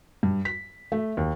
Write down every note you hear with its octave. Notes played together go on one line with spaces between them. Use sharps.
G2
B6
A3
D#2